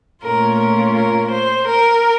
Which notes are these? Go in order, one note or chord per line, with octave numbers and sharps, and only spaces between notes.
A#2 A3 C#4 F4 A#4
A#4
A#4
C5
A#4